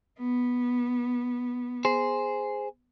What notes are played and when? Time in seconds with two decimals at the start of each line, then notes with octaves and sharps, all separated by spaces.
0.19 B3
1.85 G#4 C5